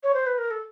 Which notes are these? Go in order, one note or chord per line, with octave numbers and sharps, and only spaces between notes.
C#5
C5
B4
A#4
A4